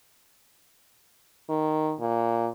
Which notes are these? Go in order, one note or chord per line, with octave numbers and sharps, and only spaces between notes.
D#3
A#2